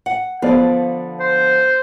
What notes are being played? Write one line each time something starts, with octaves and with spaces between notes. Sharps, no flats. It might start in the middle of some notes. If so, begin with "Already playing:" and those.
F#5
D3 F3 B3 D5 F5
C5